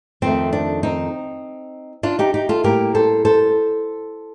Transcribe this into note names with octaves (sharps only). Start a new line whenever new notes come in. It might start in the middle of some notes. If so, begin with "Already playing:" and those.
F2 D#3 A3 C4
D4
C4 D#4
D4 F4
D#4 G4
D#4 G4
F4 A4
A2 G3 A#3 G4 A#4
A4 C5
A4 C5